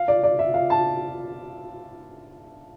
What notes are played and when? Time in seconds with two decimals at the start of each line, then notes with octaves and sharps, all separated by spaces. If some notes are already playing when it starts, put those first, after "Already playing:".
Already playing: F5
0.08 D5
0.23 D5
0.39 E5
0.54 F5
0.70 A5